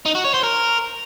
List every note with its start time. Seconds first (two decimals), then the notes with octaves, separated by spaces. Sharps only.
0.06 D#4
0.15 F#4
0.25 C#5
0.34 C5
0.43 A#4